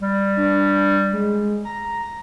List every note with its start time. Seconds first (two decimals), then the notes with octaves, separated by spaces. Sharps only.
0.01 G3
0.37 D4
1.13 G#3
1.65 A#5